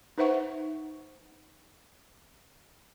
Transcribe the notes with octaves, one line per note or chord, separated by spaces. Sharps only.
D#4 B4 C5 E5 F#5 C#6